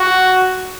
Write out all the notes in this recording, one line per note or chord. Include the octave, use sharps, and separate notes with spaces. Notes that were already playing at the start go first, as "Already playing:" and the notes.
Already playing: F#4